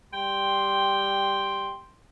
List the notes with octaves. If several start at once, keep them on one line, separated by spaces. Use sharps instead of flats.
G3 G5 C6